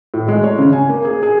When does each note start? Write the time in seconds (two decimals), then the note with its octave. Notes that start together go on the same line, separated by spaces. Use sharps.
0.14 A2
0.28 G#3
0.44 C#5
0.58 C#3
0.73 G#5
0.89 A#3
1.05 G#4
1.23 G#4